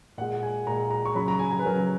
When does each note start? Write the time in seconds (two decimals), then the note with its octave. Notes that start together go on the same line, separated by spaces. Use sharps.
0.18 A#2 G#3 F#5
0.43 G#5
0.67 A#2 G#3 A#5
0.91 A#5
1.05 C#6
1.15 C#3 F#3 B5
1.28 A#5
1.39 G#5
1.51 G#5
1.59 B4
1.64 C#3 F#3 A#4